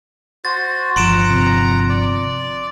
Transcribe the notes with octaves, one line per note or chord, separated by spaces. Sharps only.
F#4 C5 A6
G1 F3 F#5 A#5 C6 D7 E7
C3
D5